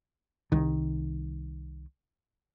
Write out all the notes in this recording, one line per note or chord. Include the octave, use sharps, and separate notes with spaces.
C2 D#3